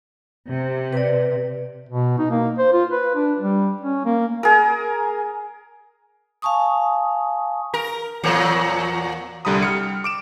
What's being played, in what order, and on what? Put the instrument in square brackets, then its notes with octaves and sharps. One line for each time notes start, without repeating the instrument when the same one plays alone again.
[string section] C3
[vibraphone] B4 D5
[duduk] B2
D#4
A#3
C5
F4
B4
D4
G3
C#4
A#3
[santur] G#4 A#4
[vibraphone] F5 G#5 A5 C#6 D#6
[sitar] A#4
E2 A#2 F#3
[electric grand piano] C2 D3 G3 A#5 B5 D#6
G3 F6 C#7
D6 D7 E7